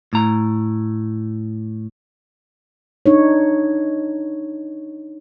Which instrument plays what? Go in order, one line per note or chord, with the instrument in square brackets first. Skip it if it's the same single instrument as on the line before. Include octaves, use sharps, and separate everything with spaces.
[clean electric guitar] A2 A#5
[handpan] D4 D#4 C#5